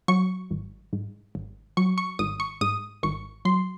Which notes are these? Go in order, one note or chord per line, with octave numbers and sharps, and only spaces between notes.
F#3 C#6
G#1
G#2
G#1
F#3 C#6
C#6
G#1 D#6
C#6
G#2 D#6
G#1 C#6
F#3 C6